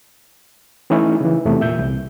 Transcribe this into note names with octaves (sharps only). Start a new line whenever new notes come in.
E3 A3 C#4 D#4 E4
C#3 E3
E2 C3 A3
A#2 E5 G6
C2